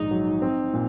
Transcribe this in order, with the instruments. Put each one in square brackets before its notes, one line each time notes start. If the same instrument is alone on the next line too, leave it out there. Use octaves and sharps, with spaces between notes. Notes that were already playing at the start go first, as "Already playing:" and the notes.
Already playing: [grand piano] A#1 G#2 D#3 [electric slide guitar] D#4
[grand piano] F#3
C4
A#2